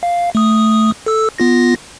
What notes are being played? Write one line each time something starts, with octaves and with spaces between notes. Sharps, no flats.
F5
A3 D#6
A4 E6
B3 F4 A#6